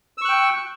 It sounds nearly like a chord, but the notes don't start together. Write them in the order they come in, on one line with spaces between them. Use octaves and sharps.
E6 C#6 F#6 G5